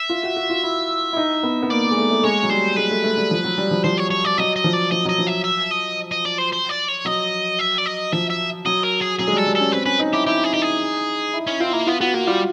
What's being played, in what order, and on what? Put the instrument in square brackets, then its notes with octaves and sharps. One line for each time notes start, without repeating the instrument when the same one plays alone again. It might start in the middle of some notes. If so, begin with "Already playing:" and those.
Already playing: [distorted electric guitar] E5
[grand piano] F4
F#4
F#4
F4
E4
E4
D#4
B3
B3
[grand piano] A#3 [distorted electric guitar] D5
[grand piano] A#3
G#3
A3
A3
[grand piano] G#3 [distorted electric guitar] C#5
[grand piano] F#3
[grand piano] G3 [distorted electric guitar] C5
[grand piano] G#3 [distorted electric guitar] B4
[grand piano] A3
A3
G3
F3
F#3
G3
F3
[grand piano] F3 [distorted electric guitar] C5
[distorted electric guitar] C#5
C#5
D5
[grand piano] F#3 [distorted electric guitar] D#5
[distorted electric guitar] D#5
[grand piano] F3
[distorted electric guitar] D5
[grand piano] F3 [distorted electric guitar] D#5
[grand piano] F#3 [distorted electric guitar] D#5
[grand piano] F3
[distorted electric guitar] E5
E5
D#5
D#5
D5
C5
C5
D5
C#5
[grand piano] F#3 [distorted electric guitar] D#5
[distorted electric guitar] E5
D5
D#5
[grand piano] F3 [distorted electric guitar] E5
[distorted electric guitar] E5
[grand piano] F#3 [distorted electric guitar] D#5
[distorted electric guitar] A#4
G#4
[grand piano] F#3 [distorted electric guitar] G#4
[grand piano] G#3
G3
[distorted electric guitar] A4
[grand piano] G3
[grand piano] C#4 [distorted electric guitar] A4
[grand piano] C4 [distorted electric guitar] B4
[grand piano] C#4 [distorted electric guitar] B4
[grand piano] D#4
[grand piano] E4 [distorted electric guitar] G4
[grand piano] E4 [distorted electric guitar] G4
[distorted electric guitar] G#4
[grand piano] D#4 [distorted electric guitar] G4
[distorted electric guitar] G#4
[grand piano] E4
[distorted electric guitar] C#4 [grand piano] E4
[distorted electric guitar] C4 [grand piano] F4
[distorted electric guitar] A#3 [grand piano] E4
[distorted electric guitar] B3 [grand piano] F4
[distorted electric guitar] B3 [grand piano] F#4
[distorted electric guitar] A#3 [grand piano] F#4
[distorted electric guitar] G3 [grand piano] F4